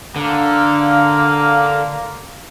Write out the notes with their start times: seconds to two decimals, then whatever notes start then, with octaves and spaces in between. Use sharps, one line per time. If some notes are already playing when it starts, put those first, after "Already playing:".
0.16 D3 A#3 F5